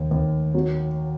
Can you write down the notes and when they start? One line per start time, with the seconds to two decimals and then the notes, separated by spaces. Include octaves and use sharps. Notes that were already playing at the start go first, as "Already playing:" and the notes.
Already playing: D#2
0.11 D#2
0.54 F#3